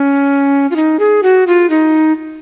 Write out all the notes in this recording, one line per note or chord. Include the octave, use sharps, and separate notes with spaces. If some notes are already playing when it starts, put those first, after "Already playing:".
Already playing: C#4
F4
D#4
G#4
F#4
F4
D#4